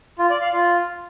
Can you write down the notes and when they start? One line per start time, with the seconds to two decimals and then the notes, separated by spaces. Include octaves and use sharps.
0.19 F4
0.30 D5
0.41 F5
0.53 F4